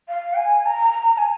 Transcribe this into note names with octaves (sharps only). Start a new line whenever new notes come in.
F5
G#5
A#5
G#5